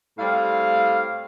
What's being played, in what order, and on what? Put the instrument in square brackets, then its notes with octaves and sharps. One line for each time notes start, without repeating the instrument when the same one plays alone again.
[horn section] A2 G3 C4 F5